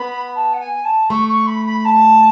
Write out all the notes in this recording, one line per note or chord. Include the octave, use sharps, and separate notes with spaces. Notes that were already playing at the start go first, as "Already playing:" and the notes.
Already playing: B3 B5
A5
F#5
G#5
A5
A3 C#6
C#6
B5
B5
A5